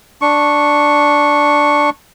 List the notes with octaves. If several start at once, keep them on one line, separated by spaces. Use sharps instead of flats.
D4 C#6